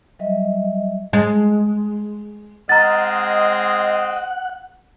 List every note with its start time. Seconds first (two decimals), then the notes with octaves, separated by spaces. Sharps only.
0.19 F#3 G3 D#5 E5
1.13 G#3
2.69 G#3 C4 D#5 F#5 A#5 F6 A6